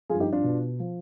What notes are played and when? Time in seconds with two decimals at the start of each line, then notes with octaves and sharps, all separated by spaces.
0.10 F3 F4 G#4
0.14 G2
0.20 D#4 G4
0.32 D4 F4
0.43 B2
0.79 F3